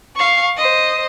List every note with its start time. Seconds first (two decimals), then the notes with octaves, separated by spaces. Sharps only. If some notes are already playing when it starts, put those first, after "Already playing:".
0.16 F5 C#6
0.57 C5 D#5